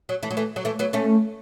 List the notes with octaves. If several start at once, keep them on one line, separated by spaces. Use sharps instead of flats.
F#3
E3 A3
F#3
E3 A3
F#3
E3 A3
F#3 B3
A3 C#4